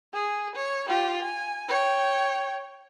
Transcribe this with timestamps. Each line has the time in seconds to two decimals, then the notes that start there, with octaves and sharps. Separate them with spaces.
0.14 G#4
0.55 C#5
0.88 F4 G4
1.22 G#5
1.69 C#5 G5